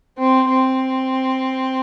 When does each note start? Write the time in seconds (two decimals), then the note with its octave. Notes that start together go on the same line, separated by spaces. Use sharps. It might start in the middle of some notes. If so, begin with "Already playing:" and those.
0.18 C4
0.49 C4